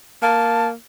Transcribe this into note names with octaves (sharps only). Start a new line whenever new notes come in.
A#3 A5